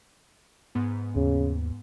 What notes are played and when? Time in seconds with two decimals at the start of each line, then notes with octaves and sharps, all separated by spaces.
0.75 G#2 B3
1.16 D#2 C#3